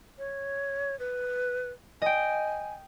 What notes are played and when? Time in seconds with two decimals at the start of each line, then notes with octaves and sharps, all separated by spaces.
0.18 C#5
0.99 B4
2.02 D#5 G5 G#5